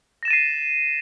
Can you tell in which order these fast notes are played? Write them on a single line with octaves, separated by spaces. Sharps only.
A#6 E7 A6 D#7 C7